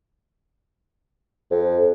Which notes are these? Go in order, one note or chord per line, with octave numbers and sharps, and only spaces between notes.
F2